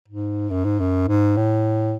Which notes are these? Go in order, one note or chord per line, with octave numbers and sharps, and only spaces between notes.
G#2
F#2
G#2
F#2
G#2
A2